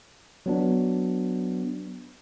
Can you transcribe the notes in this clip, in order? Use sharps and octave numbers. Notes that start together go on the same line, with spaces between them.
F#3 B3 D4